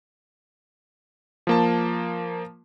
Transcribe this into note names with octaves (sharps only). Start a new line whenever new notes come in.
F3 A#3 A5